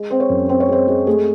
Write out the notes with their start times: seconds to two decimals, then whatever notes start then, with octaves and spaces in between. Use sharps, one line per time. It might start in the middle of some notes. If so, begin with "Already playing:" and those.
Already playing: G#3
0.10 C4 C5
0.20 C#5
0.29 F#2
0.49 C4 C5
0.60 C#5
0.69 G#3 C5
0.88 G#3
1.07 A3 G#4